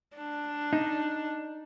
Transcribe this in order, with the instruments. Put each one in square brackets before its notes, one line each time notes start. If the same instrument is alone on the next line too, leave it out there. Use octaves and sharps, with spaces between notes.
[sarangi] D4
[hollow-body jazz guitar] D#4